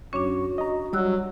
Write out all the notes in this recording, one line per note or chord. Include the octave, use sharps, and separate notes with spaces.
F#2 C#4 D4 F#4 C#5 C#6
D#5 A#5
F#3 G3 D5 E6 F#6